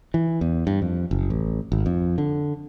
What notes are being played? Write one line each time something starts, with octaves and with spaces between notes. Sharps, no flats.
E3
E2
G2
F2
F#1
A1
G#1
F2
D3